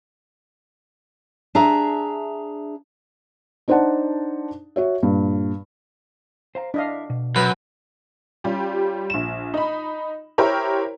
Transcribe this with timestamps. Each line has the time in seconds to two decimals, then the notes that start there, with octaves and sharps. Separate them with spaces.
1.55 D4 G#4 E5 A#5
3.68 D4 D#4 C5 D5 F#5 A5
4.76 F#4 C#5 E5
5.03 G2 A#2
6.55 C5 F5 A#5
6.74 D4 E4 D#5 F5
7.10 B2
7.36 F#2 B4
8.44 G3 C#4 F4 G4
9.10 A#1 E7
9.54 D#4 B5
10.38 E4 G4 A#4 C5 C#5